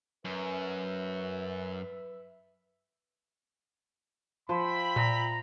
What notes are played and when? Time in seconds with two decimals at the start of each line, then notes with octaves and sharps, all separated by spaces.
0.25 F#2 B4 E5
4.49 F3 C5 E5 G5 B5
4.96 A#2 A#5